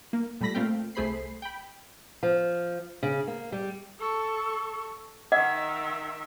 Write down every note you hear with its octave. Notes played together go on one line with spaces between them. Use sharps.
A#3
A#2 G3 A3 B5 A#6 B6
A#2 A3 C4 F5 G5
C2 A3 G#4 C5 B5 C7
G5 B5
F3
C#3
A#3
G3
A4 C#6
D#3 D#5 E5 F#5